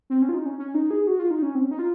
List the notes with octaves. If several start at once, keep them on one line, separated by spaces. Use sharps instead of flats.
C4
C#4
F4
D#4
C#4
C#4
D#4
G#4
F#4
F4
D#4
C#4
C4
C#4
D#4
F4